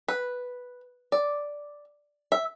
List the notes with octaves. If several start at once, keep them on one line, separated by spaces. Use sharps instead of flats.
B4
D5
E5